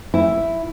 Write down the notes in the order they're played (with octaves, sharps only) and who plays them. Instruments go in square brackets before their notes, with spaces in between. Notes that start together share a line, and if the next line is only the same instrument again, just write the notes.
[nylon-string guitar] E4